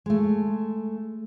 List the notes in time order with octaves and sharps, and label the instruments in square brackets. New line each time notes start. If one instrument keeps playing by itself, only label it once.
[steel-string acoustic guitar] G#3 A3